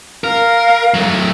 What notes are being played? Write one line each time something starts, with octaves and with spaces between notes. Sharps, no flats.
A#4 F5
F#3 A3